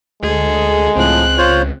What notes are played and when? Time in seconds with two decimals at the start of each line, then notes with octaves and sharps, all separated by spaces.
0.23 D2 G#3 G#4 A4
0.96 C#2 A2 F3 C4 F#6
1.38 F4 C5 C#5